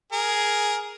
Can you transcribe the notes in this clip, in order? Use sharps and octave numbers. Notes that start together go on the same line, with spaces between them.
G#4 A#4